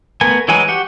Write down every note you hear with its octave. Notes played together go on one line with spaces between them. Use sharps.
A3 B3 A#4 G#5
E3 F#3 G#3 D#4 G#5
F#4 G4 F#5